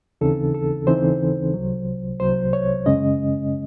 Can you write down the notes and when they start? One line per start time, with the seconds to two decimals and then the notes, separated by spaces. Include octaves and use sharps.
0.21 D#2 C#3 E3 C4 D#4 A4
0.54 A4
0.87 D#2 C#3 E3 C4 D#4 C5
1.54 C2 C3 F#3
2.20 C2 C3 F#3 C5
2.53 C#5
2.86 F#2 C#3 G#3 C#4 D#5